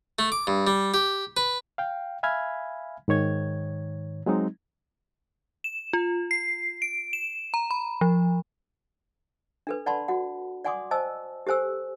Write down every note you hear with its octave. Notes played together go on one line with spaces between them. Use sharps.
A3
D6
G2
G3
G4
B4
F5 G5
E5 F5 G#5 B5 F6 G#6
G#2 D#3 C#5 G#6
F#3 G#3 C4 D#4
E7
F4
C7
D7
E7
A#5
B5
F3
D4 A4 B4
D5 F#5 A5 B5 C6
F#4 F#5
D5 F#5 G#5 C6 D6 D#6
C5 D#5 G#5 A5 E6
G4 A4 C5 G#5 E6